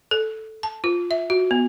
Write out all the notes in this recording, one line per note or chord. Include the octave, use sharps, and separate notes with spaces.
A4
A5
F4
E5
F#4
B3